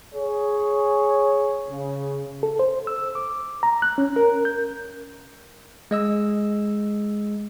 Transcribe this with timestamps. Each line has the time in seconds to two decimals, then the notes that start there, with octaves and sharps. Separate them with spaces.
0.14 G#4 C#5
1.70 C#3
2.43 A4
2.59 C5
2.87 E6
3.15 D6
3.63 A#5
3.82 F#6
3.98 C#4
4.16 A#4
4.45 G6
5.91 G#3 D#5 E6